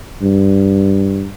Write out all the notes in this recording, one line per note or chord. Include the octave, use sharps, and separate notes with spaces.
G2